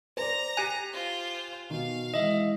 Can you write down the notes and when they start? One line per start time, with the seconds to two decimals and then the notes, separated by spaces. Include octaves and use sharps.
0.17 C5 D5 A#5
0.57 G4 G#5 F#6 B6 D#7
0.93 F4 C5
1.70 B2 D#3 F5
2.14 E3 G#3 D#5 E5